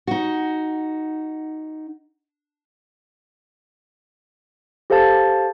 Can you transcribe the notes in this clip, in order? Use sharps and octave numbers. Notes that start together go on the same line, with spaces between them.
D#4 F#4
G4 A4 C5 F5 A5 A6